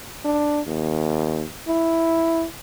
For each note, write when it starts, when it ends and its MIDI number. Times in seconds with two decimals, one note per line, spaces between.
0.25 0.61 62
0.67 1.45 39
1.68 2.45 64